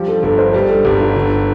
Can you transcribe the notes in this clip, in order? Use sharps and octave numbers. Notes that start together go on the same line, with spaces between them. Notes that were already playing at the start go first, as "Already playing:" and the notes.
Already playing: F3 G3 G4
A4
G1 A4
C5
G3 C5
A4
G1 G4
F4
D3